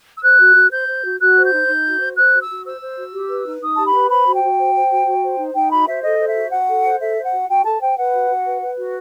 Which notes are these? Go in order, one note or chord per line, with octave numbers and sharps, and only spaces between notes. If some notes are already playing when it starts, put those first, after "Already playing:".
E6
C5 F#6
F#4
F#4
C5 G6
C5
F#4
F#4 F#6
C5
G6
D#4
D#4
F#4
C5
C5 F#6
F#4
E6
F#4
C5 E6
C5
F#4
G4
B4
D#4
D#4 D#6
G4 A5
B5
B4
C5 B5
F#4
G5
F#4
C5
C5
F#4
F#4
C5
D#4
D#4 G5
F#4 B5
C5 E5
A4 D#5
C5
E5
F#4
F#4 F#5
A4
C5
A4 E5
C5
F#5
F#4
F#4 G5
A4 A5
C5 G5
B4 F#5
F#4
F#4
B4
B4
F#4